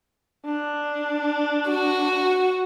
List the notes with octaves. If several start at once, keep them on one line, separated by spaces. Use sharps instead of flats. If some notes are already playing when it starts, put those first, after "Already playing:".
D4
F#4